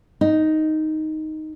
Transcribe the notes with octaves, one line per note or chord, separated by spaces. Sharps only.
D#4